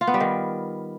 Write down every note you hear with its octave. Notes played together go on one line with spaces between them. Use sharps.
F4
B3
G3
D#3